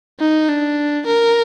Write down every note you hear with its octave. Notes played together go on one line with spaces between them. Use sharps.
D#4
D4
A#4